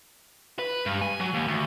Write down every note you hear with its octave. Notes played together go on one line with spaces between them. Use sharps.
B4
G2
G#5
F#3
D#2
D2